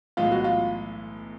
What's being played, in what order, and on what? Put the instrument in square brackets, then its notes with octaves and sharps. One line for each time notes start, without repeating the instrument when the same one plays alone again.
[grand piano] B1 A2 E3 G#3 [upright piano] F4
[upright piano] F#4
F4